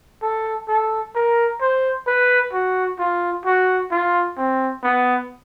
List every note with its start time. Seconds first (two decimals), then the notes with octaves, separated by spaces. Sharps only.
0.22 A4
0.68 A4
1.15 A#4
1.61 C5
2.07 B4
2.53 F#4
2.99 F4
3.46 F#4
3.91 F4
4.37 C4
4.83 B3